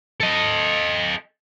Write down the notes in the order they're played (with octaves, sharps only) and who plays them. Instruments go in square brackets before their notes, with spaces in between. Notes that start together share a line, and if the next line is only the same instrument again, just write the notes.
[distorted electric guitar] A4 D#5